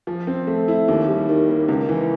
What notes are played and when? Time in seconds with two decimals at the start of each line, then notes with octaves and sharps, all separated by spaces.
0.07 F3
0.27 C4
0.47 A3
0.68 E4
0.88 D#2
1.08 G3
1.29 D#3
1.49 A#3
1.68 C#2
1.89 E3